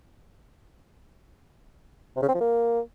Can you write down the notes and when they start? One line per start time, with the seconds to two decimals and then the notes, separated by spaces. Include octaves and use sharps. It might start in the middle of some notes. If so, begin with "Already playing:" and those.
2.16 C3
2.22 C#3
2.28 C4
2.35 F3
2.41 A#3